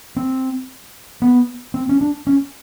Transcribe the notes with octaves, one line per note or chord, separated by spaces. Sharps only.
C4
B3
C4
C#4
D4
C#4